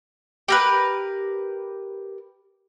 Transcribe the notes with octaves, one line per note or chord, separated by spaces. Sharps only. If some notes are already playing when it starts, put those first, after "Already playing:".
G4 A#4 B4